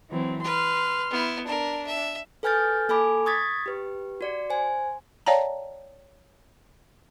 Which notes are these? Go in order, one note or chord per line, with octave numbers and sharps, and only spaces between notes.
E3 F#3 C4
B4 C6 F6
B3 E4
D4 A#4
E5
A4 B4 G#5 F6 G6 A6
A#3 A4 G#5 B5 D6
C#6 D#6 G#6 A6 B6
G4 B4
F#4 D5 C#7
C5 G#5
C#5 D5 F5 G5 A5 A#5